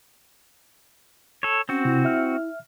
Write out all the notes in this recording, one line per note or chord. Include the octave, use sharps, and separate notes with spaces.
A4 C#5
C4 C#4 F#4
C3 E4
E5 F6